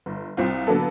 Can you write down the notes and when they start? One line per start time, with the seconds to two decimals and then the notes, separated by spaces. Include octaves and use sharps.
0.06 G1
0.37 C2 C4 F4
0.67 D3 F#3 A#3 B3 A4